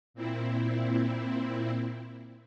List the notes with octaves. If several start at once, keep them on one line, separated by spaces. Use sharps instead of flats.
A#2 C4 E4